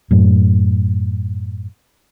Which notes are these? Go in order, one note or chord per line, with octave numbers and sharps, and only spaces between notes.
F#2 A2